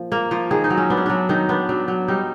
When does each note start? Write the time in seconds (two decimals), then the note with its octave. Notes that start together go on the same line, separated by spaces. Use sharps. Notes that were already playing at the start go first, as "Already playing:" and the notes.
Already playing: A#2 F3
0.12 A#3
0.31 F3
0.51 D#3 G#4
0.64 D#4
0.70 F#3
0.77 C#4
0.90 B3 D4
0.97 C#4
1.06 F#3 D4
1.29 D#3 D#4
1.49 B3 D4
1.69 F#3 D4
1.88 F#3
2.08 G3 D#4